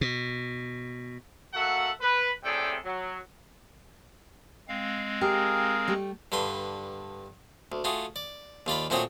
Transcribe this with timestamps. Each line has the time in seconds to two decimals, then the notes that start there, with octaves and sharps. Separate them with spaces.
0.01 B2
1.54 A#3 F#4 A4 E5 F#5
2.01 B4
2.44 A2 C3 G#4 A4 D5 G5
2.84 F#3
4.68 G#3 C4 F5
5.21 G4 G#4 A#4
5.88 G3 A3 G4
6.32 G2 D3 B4 C6
7.72 D2
7.84 A3 F4 F#4 G#4
8.16 D5
8.66 D#2 F4 D5 B5
8.90 A#2 A3 C4 F#4 G#4 C#5